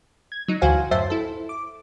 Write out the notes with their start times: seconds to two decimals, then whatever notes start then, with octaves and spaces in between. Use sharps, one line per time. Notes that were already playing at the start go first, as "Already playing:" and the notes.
0.32 G#6
0.48 F#3 D#4
0.61 D2 E3 F#4 C5 F5 G#5
0.91 F#2 A2 C5 E5 A5 C6
1.10 E4 A4
1.49 D6